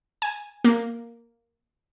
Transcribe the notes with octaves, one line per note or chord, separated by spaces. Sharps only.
G#5
A#3